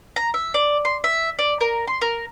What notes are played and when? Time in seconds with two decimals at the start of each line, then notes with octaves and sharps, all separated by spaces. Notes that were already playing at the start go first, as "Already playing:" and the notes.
0.16 A#5
0.34 E5
0.54 D5
0.85 C6
1.04 E5
1.39 D5
1.61 A#4
1.87 C6
2.01 A#4